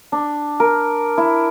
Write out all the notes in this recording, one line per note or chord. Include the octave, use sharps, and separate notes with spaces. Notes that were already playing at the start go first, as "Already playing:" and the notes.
D4
A#4
E4